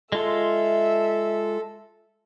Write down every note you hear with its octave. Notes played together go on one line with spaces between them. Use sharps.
G#3 F4 A4 E5 C6